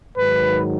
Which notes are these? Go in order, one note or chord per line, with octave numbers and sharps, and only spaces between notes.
G#2 D#3 F#3 B4